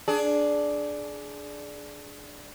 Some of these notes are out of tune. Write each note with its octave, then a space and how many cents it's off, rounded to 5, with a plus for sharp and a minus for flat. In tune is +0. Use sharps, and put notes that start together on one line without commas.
D4 +0 G#4 +20